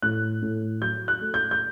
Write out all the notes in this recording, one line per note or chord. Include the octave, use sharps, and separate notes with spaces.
A2 F#6
A2
F#3 G6
F#6
A3
G6
G6